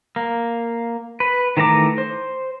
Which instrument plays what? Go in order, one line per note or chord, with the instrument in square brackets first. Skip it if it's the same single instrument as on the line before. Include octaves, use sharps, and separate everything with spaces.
[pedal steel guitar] A#3
B4
D#3 E3 A3 A#5 D6
C5